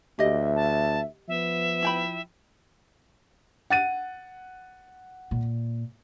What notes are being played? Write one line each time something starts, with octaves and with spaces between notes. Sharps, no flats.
D2 G4 D#5 E5
A5
F3 B3 E5
E4 G5 B5
F#5 A6 D#7
A#2